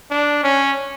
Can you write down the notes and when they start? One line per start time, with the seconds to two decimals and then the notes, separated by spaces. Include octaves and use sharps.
0.11 D4
0.43 C#4